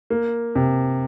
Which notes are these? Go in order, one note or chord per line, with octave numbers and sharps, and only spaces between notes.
A#3
C3